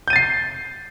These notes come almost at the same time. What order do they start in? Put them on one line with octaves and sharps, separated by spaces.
G6 D#7 A6 C7